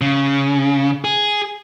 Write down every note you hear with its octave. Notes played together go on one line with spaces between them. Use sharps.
C#3
G#4